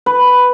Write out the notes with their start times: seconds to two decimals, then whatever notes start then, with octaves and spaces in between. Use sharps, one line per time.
0.06 B4